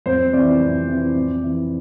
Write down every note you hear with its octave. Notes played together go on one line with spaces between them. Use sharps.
F2 C5
C3 E3 D5
F2
C3 E3
F2
C3 E3